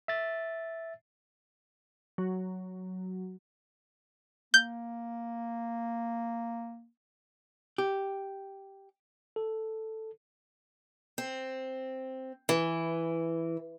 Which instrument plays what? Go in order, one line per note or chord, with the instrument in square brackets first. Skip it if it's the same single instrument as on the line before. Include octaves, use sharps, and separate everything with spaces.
[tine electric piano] E5 A6
[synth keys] F#3
[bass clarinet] A#3 [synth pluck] G6
[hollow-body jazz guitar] G4
[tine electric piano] A4
[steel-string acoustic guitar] C4
E3